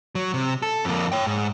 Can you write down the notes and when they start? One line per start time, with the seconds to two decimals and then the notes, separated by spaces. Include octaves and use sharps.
0.15 F#3
0.34 C3
0.62 A4
0.85 F2 A#3
1.12 C#5 G5
1.27 G#2